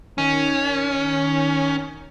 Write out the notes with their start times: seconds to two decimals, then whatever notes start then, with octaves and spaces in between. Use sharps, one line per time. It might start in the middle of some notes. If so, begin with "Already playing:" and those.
0.18 D#3 C#4